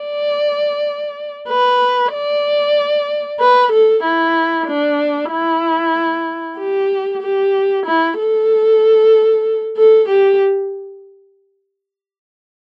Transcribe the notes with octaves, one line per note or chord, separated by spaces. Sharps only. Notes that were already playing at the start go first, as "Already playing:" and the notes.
Already playing: D5
B4
D5
B4
A4
E4
D4
E4
G4
G4
E4
A4
A4
G4